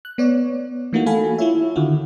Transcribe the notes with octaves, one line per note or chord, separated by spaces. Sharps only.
F#6
B3 C#5 D5
E3 A3 A#3 D#4 F4 F#4
F#4 A4 F5 G#5 B5
E4 F4 C#5 E5
D3 D#3 F4 F#4